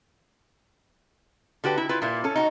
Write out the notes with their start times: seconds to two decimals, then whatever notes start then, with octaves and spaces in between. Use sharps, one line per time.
1.64 D3 F#4 G4 B4
1.78 E4
1.89 E4 F4 B4
2.02 A#2 A#3 E4
2.24 C#4 A4
2.36 D#4 F4 F#4